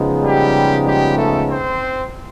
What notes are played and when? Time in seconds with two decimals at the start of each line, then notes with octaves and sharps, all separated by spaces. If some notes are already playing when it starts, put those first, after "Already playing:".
Already playing: C#3 F3 G#3 B3 D#4
0.22 G3 G4
0.85 G3 G4
1.16 A3 A4
1.48 C4 C5